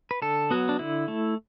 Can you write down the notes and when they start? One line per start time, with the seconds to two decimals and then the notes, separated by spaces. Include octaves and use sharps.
0.11 B4
0.22 D3 A4
0.51 F#3 B3 F#4
0.69 D4
0.79 D3 E4
1.08 A3